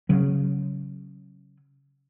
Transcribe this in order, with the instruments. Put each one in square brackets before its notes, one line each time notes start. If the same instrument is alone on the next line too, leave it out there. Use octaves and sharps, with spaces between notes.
[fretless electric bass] C#3 F#3